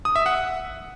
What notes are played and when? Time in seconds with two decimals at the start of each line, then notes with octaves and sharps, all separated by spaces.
0.05 D#6
0.16 E5
0.26 F#5